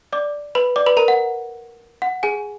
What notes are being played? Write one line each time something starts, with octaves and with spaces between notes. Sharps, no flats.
D5 D6
B4 B5
D5 D6
B4 B5
A#4 A#5
F#5
F#5
G#4 G#5